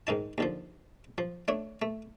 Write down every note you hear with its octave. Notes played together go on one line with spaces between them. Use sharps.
G#2 D#3 D#4 A5
D#2 D3 F3
F3
A3 D4 C#5
A3